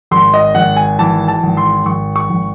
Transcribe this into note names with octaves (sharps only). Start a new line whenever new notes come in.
G#1 C6
D#5
G#1 F#5
G#5
E3 A5
A5
G#1
C6
G#1 C#6
C#6
G#1